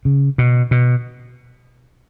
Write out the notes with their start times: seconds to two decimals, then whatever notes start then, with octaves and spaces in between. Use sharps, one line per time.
0.05 C#3
0.38 B2
0.71 B2